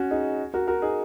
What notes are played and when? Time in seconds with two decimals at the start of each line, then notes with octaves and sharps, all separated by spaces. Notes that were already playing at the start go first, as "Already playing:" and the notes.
Already playing: C#4 F#4
0.11 D#4 G#4
0.54 F#4 A#4
0.68 F#4 A#4
0.82 D#4 G#4